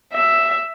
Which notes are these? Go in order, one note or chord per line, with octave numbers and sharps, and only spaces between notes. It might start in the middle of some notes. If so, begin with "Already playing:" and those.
E5